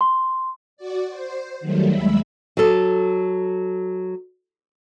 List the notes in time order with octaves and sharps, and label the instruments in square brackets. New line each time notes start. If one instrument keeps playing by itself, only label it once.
[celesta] C6
[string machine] F#4 D5
C5
D#3 F#3 G3 A3
D#2 G#3 E5 B5
[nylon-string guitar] F#3 A4